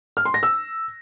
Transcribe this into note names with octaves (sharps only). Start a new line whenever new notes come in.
F6
C6
A#6
E6